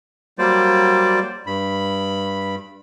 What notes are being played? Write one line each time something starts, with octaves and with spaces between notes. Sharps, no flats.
F#3 G3 A#3 C5 D5
G2 B5